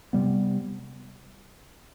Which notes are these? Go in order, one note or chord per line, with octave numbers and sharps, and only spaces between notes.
C3 G3 B3